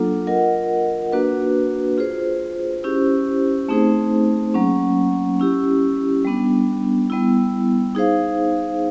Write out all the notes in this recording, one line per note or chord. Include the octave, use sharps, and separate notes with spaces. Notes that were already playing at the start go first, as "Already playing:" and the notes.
Already playing: F#3 A#3 D4 F4 A4
F4 A#4 D#5 F#5
A#3 D4 F#4 B4
F4 G#4 C5
C#4 E4 G4 C5
A3 C4 D#4 G#4 C5
F#3 A#3 C#4
C#4 E4 G4
G3 B3 D4
G3 B3 E4
D#4 G#4 C5 F5